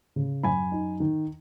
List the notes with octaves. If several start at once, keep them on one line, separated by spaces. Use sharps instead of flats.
C#3
F#2 G#5 B5
D#4
D#3